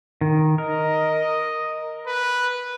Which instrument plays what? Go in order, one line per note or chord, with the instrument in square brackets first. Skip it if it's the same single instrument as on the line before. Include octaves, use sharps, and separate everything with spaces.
[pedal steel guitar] D#3
[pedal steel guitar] A#4 [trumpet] D#5
[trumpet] B4